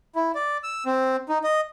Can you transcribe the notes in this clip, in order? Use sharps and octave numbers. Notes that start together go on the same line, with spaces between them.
E4
D5
E6
C4
D#4
D#5